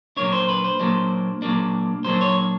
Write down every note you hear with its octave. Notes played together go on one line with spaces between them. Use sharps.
A#2 F#3 A#3 D4 C#5
C5
B4
C5
A#2 F#3 A#3 D4
A#2 F#3 A#3 D4
A#2 F#3 A#3 D4 C5
C#5